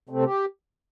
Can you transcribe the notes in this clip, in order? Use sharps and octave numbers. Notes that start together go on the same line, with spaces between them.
C3 A3 C4
G4